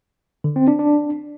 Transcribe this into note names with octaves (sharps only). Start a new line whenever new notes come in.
D3
C4
D4
D4